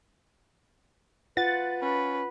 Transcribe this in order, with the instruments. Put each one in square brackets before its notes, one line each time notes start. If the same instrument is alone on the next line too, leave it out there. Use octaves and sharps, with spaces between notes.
[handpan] F4 F#5 [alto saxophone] B4 [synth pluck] A6
[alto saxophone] C#4 [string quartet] B4